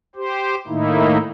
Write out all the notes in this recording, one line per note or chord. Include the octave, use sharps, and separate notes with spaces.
G4 C5
A2 D#3 A#3 D#4 E4